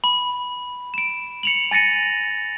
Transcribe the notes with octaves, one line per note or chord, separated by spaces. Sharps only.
B5
D7 E7
C#7 F7 F#7
G#5 A6 A#6 C#7 D#7